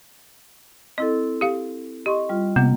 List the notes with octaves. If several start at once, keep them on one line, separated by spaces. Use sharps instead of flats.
C4 E4 A4 D#5
G4 F5
G4 D#5 C6 C#6
G3 F4
C3 A#3 B3